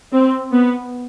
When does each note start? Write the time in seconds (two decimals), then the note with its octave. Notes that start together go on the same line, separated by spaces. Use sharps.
0.12 C4
0.53 B3